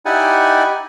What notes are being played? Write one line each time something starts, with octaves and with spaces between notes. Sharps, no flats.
D#4 E4 G4 D5 F#5 G#5